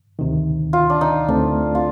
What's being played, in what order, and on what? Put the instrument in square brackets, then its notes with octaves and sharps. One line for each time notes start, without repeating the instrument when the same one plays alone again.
[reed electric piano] D2 C3 D#3
[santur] F4
D4
D#4
[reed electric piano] D2 D3 A3 C4 [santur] D4
[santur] F4